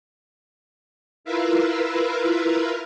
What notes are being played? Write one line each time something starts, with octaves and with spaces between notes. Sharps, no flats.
E4 F4 A#4 B4 E5 F5